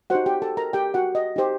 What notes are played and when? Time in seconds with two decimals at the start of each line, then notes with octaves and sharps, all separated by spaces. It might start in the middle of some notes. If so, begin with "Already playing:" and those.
0.10 D#4 F#4 G4 C5 F#5
0.26 G4 G5
0.42 A4 A5
0.57 A#4 A#5
0.73 G4 G5
0.94 F#4 F#5
1.15 D#5
1.36 D#4 G4 C5